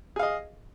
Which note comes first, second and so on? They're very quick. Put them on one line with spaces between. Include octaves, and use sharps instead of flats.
G#4 F5 D#5